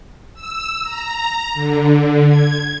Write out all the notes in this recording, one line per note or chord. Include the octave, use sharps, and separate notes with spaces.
E6
A#5
D3
G#6